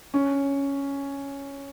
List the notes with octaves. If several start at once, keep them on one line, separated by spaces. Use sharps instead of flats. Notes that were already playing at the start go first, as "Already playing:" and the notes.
C#4